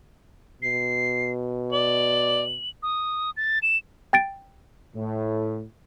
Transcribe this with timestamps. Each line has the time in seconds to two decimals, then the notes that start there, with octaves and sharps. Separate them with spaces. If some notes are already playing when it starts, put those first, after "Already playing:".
0.62 B2 C7
1.72 D5 F#7
2.83 D#6
3.37 A6
3.63 E7
4.13 G5 A6 D7
4.95 A2